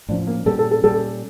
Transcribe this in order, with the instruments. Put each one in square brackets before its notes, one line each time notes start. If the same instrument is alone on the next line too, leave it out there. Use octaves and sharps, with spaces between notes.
[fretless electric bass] A2 F3 C#4 [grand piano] D4
[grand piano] A#3
[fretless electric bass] A#2 G3 C#4 [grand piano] A4
[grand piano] A4
A4
[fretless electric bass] A#2 G3 C#4 [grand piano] A4